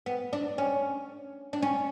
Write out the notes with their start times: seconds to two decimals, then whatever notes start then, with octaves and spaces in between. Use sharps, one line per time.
0.06 B3
0.33 D4
0.58 C#4
1.53 D4
1.62 C#4